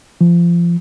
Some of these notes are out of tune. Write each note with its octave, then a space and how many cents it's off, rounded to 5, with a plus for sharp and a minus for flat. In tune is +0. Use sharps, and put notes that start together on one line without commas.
F3 -25